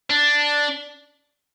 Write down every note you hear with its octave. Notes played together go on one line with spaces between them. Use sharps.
D4